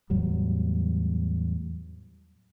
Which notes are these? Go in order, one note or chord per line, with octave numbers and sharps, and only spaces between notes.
E2 A2 F#3 G3